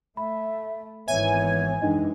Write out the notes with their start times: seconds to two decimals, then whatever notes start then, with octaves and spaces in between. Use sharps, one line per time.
0.17 A3 E5 B5
1.08 G#1 E3 B3 C#5 E5 G#5
1.82 F#2 E3 G#3 D4 D#4 D#5